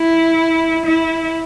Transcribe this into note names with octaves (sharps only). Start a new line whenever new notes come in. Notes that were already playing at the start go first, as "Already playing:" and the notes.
Already playing: E4
E4